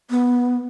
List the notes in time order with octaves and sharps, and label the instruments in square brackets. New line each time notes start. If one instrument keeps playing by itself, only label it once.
[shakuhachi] B3